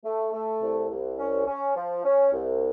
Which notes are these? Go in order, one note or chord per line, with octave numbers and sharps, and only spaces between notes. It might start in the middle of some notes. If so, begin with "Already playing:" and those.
A3
A3
C2
C2
C#4
C#4
F3
C#4
C2